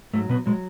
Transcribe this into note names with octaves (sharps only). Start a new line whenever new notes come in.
G#2 F#3 A3
B2 B3
B2 F#3 G#3